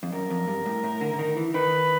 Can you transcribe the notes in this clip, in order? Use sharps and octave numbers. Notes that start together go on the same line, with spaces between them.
F2
F#2 A#4
F2
G2
A2
A2
D3
D3
D#3
E3
D#3 B4